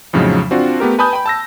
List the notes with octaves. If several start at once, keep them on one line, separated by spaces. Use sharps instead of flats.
F2 A2 C#3 F3 F#3 D#4
C4 D4 F4 F#4
A3 B3 G4 A#4
B4 G#5 A5 B5 D#6 G6
G5 B5
A5 E6 A#6